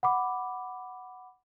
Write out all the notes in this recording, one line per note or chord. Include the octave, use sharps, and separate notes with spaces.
F#5 B5 D6